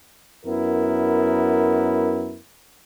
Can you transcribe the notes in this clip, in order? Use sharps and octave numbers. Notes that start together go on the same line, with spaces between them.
F#2 B3 E4 A#4